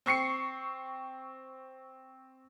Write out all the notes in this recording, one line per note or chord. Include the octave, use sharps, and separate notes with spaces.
C4 C#6 C7 C#7